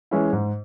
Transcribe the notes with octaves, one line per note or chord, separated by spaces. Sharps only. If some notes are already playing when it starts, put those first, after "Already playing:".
E3 G#3 C#4 E4
G#2